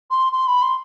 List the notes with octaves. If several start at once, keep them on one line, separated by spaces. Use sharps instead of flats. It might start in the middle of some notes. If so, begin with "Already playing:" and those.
C6
C6
B5
C6